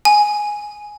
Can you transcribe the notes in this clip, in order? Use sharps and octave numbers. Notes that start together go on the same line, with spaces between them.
G#5